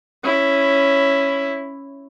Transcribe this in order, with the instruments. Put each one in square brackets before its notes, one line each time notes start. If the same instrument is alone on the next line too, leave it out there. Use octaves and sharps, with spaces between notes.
[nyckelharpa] C#4 E4